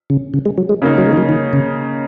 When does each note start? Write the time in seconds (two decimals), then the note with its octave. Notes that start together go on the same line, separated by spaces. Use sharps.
0.10 C#3
0.34 C#3
0.45 G#3
0.58 F#3
0.69 G#3
0.82 C#3 A#3 D#4
0.98 F#3
1.06 G#3
1.13 D#3
1.17 F#3
1.29 D#3
1.53 C#3